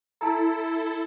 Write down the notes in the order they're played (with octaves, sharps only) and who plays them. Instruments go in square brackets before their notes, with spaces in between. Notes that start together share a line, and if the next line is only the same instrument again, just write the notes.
[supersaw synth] E4 A4 [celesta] A5 A#5